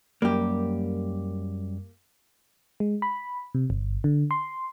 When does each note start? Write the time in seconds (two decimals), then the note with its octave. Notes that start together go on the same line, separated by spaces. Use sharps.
0.22 F#2 G3 A#3 G4
2.80 G#3
3.02 B5
3.54 C3
3.70 G1
4.04 D3
4.31 C6